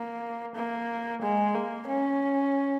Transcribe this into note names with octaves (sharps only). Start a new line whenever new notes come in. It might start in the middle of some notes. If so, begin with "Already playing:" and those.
Already playing: A#3
A#3
G#3
A#3
C#4